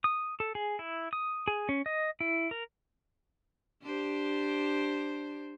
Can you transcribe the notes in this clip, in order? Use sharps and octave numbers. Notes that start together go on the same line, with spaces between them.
D#6
A4
G#4
E4
D#6
G#4
C#4
D#5
E4
A#4
D4 G4 C5